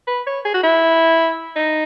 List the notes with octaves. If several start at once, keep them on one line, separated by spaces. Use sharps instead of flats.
B4
C#5
G#4
F#4
E4
D#4